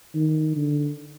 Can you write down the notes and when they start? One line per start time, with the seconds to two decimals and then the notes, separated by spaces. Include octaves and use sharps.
0.15 D#3
0.56 D3